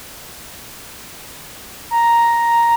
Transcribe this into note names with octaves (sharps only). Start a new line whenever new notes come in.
A#5